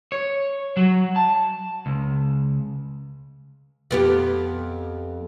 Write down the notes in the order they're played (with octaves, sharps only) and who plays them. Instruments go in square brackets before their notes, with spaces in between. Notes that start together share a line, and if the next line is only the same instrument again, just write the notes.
[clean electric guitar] C#5
F#3
A5
C#2
[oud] F2 B3 G4